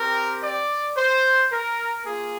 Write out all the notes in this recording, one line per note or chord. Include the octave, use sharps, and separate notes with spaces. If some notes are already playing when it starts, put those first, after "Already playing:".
Already playing: C4 G4 A#4
D5
C5
A#4
A#3 F4 G#4